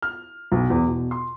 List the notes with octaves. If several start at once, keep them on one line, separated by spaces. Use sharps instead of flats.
F6
B1
E2
B2
C6